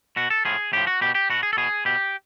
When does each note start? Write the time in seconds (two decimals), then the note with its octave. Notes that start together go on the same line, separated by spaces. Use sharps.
0.16 B2 F#4
0.30 A4
0.45 A2 F3 G#4
0.73 A2 F3 G4
0.87 F#4
1.01 B2 G4
1.15 G4
1.30 B2 F#4
1.43 G#4
1.53 A4
1.57 B2 G#4
1.85 B2 G4